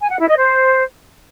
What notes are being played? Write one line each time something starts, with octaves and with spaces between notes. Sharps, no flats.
G#5
F#5
E4
D#5
C5